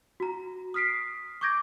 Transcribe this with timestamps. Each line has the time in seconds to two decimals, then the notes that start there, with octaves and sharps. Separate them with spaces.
0.20 F#4 A#5
0.74 D#6 F6 B6 C7 D7
1.41 C#6 D6 G6 G#6 A#6 D7